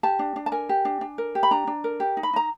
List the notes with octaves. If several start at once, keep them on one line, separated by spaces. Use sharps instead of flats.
G4 A5
D4
D4
A5
A#4 G#5
G4
D4
D4
A#4
G4
B5
D4 A#5
D4
A#4
G4
D#4
B5
D#4 A#5